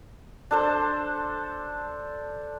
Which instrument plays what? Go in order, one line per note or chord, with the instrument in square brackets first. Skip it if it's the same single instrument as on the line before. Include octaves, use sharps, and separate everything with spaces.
[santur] D4 A4 C5